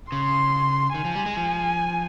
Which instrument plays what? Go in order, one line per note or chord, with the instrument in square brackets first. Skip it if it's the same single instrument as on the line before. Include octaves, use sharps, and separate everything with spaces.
[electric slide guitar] C#3 [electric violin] C6
[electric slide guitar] D#3 [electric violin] G#5
[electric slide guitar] F3
G3
G#3
F3